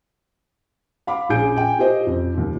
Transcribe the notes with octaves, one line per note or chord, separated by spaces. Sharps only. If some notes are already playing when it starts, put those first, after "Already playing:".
F5 B5 D6
A#1 C#4 G#4 G#5 G6 D7
G5 G#5
F4 G4 C5 D#5
F2
D#2 F3